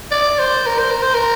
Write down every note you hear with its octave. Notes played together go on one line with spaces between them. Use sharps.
D5
C5
A#4
C5
A#4
C5
A#4